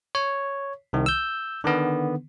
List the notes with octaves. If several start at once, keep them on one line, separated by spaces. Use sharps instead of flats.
C#5
C2 D#3
E6 G6
D3 D#3 B3